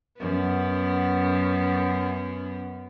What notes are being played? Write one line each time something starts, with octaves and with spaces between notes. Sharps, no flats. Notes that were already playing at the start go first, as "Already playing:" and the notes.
F#2 B3